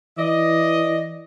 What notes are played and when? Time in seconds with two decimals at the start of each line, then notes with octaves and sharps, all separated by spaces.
0.18 E3 D5 D#5